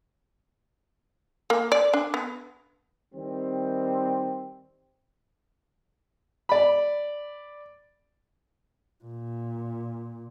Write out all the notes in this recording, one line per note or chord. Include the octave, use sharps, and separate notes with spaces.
A#3
D5
D4
B3
D#3 G3 C4
D5 B5
A#2